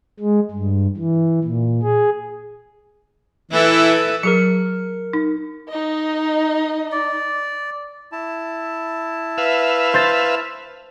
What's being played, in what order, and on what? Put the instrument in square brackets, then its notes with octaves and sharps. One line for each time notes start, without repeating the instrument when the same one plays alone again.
[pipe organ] G#3
G2
E3
A#2
G#4
[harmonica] E3 [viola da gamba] E4 A4 B4
[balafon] F#3 G#4 [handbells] A#4 C#7
[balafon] D#4
[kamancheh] D#4 D#5
[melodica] D5
[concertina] E4 A5
[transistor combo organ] B4 E5 F5
[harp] C5 A6